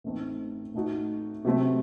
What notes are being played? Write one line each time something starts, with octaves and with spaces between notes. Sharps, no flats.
A1 A2 A3 C4 D#4
A2 A3 D#4 F#4
C3 F#3 A3 C4